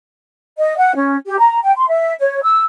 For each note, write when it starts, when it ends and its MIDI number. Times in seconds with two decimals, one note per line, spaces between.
0.59 0.76 75
0.78 0.95 78
0.95 1.15 61
1.27 1.37 67
1.40 1.59 82
1.64 1.74 79
1.76 1.88 84
1.89 2.14 76
2.20 2.43 73
2.43 2.63 88